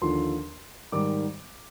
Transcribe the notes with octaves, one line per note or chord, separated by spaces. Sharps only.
D#2 D3 F3 C6
G#2 D#3 G3 D6